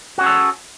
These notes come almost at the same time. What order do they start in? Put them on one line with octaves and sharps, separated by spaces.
F#4 C#4 G#4 A4